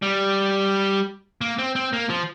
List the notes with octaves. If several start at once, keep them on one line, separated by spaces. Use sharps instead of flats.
G3
A#3
C4
C4
A#3
F3